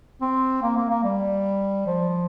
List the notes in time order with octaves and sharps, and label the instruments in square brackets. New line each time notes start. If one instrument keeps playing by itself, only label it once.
[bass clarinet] C4
A#3
A#3
A#3
G3
F3